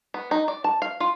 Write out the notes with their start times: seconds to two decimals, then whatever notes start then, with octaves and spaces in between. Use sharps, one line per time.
0.14 B3
0.31 D#4
0.48 D5
0.64 A5
0.82 F5
1.00 F4